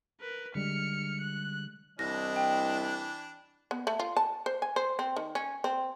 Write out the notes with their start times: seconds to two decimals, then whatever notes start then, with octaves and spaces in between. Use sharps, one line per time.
0.21 A#4 B4
0.55 D3 G3 G#3 F6 C#7
1.21 F#6
1.99 C2 E3 D4 D#5 A#6
2.36 G5
3.71 B3
3.87 A3
3.99 F4
4.17 A5
4.46 C5
4.62 G#5
4.76 C5
4.99 C4
5.16 D#3
5.35 C#4
5.64 C4